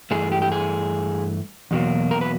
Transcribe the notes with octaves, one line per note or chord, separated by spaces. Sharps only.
G2 E3 A3 G#4
G4
G4
G#4
E2 B2 F#3 A#3
A#4
B4